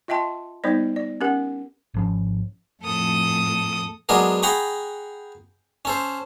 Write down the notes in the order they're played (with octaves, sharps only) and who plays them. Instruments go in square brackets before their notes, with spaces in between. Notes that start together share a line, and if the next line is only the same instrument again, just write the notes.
[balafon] F4 D#5 E5 G5 A5 C6
G3 B3 D#4 C5 D5
D5
C#4 G4 A#4 F#5
[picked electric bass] G#1 F3 C#4
[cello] F2 A2 [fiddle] A4 D#6
[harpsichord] F#3 G#3 B3 D4 G#4 A#4
G#4 F#5 G5 A#5 B5 C#6
C#4 A4 C5